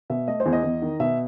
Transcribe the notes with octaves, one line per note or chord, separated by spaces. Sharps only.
B2 E5
A3 D#5
C5
E2
D#5
E2
D#3
B2 E5